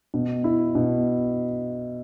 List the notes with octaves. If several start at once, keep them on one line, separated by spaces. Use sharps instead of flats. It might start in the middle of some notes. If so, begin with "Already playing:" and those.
B2
E4
B2